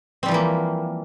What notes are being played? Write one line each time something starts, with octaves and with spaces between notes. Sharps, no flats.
E3 F3 G3 A#3 C4